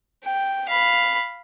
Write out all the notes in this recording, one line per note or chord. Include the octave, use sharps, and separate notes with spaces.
G5
F5 B5